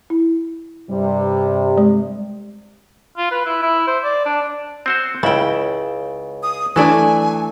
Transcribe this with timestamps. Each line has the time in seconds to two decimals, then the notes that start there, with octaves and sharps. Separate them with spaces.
0.10 E4
0.90 G2 C3 G3
1.78 G#3
3.17 F4
3.31 B4
3.46 E4
3.62 E4
3.87 C5
4.04 D5
4.26 D4
4.86 C4 F#4 C5
5.23 C#2 C#3 E4 G5
6.43 D#6
6.76 E3 F#3 A3 D4 G#5